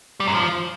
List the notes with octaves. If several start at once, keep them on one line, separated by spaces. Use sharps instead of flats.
G3
F#2
F3